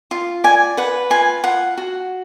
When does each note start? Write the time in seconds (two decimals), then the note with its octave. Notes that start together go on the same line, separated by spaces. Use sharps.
0.11 F4
0.44 D5 G#5
0.77 B4 F#5
1.10 F4 G#5
1.44 F4 F#5
1.77 F#4